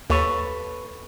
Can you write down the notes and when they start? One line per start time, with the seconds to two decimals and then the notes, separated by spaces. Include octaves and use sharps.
0.10 D#2 A4 B4 C#5